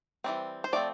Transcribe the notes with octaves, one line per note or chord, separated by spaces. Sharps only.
E3 G3 C4
C5
F3 A3 C4 D5